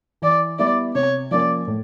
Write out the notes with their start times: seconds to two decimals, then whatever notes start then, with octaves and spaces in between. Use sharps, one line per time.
0.22 E3 D5
0.59 G3 B3 E4 D5
0.95 C3 C#5
1.31 F3 A#3 C#4 D5
1.67 A2